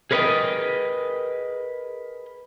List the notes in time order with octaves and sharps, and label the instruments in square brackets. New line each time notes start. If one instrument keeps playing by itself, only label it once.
[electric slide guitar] G#4 A#4 B4 C#5 D#5 G5